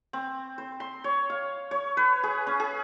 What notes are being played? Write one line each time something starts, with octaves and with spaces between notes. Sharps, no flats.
C4
C5
C6
C#5
F5
C#5
B4
G#4
C#4
G#4